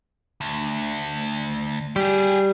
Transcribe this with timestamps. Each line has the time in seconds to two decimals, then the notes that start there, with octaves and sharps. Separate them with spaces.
0.41 D2
1.96 G3 G4 G#4